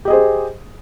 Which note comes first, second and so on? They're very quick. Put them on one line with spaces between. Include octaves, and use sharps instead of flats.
G4 D#5 G#4 C5